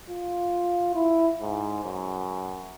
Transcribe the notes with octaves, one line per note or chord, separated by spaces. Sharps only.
F4
E4
G#2
F#2